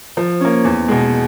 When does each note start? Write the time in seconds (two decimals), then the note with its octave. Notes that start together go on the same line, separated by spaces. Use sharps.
0.17 F3
0.41 A#3 C#4
0.64 E2
0.88 B2 G#3